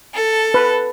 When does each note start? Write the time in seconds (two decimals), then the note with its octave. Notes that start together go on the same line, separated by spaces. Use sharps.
0.14 A4
0.54 B4